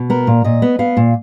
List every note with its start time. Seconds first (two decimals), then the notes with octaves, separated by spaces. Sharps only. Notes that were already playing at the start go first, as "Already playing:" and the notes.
Already playing: B2
0.10 B3 A#4
0.27 A#2
0.44 A#2 D#5
0.62 B3
0.79 B3 F5
0.97 A#2